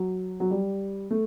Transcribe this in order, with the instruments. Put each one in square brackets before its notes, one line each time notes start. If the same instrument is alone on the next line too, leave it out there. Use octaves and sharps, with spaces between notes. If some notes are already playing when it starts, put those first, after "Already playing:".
Already playing: [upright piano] F#3
F#3
G3
A3